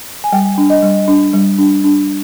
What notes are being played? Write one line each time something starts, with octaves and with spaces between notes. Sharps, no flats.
G#5
G3 G5
D4
D#5
G3
D4
G3
D4
D4